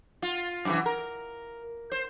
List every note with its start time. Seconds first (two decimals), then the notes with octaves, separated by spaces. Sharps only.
0.22 F4
0.65 F#2 C3 E3
0.86 A#4
1.92 C5